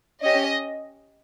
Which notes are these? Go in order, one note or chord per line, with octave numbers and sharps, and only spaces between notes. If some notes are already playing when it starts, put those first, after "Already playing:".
C#4 G4 D#5